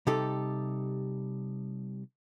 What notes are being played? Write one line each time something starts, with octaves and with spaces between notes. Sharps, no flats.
C3 G3 D#4 G4 A4